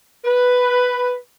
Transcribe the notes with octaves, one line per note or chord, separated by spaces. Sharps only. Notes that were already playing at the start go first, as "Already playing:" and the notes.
B4